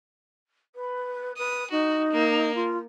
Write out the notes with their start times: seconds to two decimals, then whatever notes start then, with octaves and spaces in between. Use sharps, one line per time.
0.75 B4
1.38 B4 D#6
1.71 D#4 F#4
2.12 A#3
2.54 F4